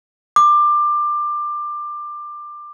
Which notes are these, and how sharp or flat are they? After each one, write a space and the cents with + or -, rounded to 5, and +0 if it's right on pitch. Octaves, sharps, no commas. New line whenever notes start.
D6 +20